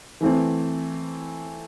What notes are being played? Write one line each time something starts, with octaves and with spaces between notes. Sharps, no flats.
E3 A3 C4